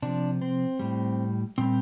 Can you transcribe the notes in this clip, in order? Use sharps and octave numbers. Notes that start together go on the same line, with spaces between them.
C3 F3 D4
C4
A2 G3
A#2 G3 C4